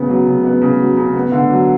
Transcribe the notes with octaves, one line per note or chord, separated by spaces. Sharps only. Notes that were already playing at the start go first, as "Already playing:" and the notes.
Already playing: C#3 B3
F#3
C#3
B3
C#3
F#3
C#3
B3
D3
F#3